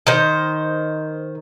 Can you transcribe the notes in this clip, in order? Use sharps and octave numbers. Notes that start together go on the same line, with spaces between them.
D#3 C5